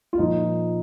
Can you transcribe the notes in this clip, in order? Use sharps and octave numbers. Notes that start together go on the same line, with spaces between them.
F4
A#2 F3 D#4